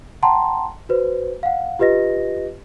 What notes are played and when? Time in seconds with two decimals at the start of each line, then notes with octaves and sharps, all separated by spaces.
0.23 F#5 G5 A5 A#5 C6
0.89 F#4 B4 C5
1.43 F5 F#5
1.79 F4 G4 B4 D#5 A#6